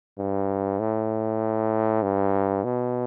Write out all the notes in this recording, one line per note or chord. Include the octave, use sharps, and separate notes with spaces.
G2
A2
G2
B2